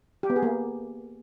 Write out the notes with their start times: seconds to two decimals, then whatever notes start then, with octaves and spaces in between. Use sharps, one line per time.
0.23 G4
0.30 B3
0.36 G#4
0.43 A#3